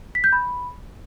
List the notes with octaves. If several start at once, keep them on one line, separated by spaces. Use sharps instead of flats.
B6
G6
B5